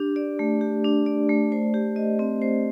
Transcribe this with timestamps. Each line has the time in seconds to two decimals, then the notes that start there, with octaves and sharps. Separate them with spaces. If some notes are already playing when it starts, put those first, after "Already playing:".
Already playing: D4 G4
0.16 D5
0.39 A3
0.61 G4
0.84 D4
1.06 D5
1.29 A3
1.52 C5
1.74 G4
1.96 D#5
2.19 C4
2.42 C5